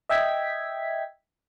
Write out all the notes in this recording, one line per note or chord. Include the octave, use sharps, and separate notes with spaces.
D#5 E5 G5 G#6 B6